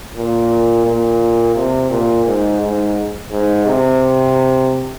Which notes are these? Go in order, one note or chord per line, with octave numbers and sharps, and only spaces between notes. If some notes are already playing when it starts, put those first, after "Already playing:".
A#2
A#2
C3
A#2
G#2
G#2
G#2
C3